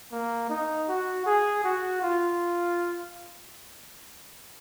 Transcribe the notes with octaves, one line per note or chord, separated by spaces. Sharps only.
A#3
D#4
F#4
G#4
F#4
F4